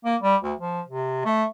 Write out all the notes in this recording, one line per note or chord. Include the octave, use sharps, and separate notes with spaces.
A#3
G3
D2
F3
C3
A3